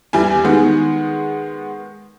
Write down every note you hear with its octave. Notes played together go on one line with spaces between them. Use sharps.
E2 G3 E4 G#5
D#3 G#3 B3